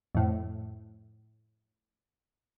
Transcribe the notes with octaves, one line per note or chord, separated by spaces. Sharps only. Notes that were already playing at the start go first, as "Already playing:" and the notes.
F2 A2